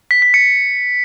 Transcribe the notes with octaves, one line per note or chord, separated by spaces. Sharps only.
B6
B6
C#7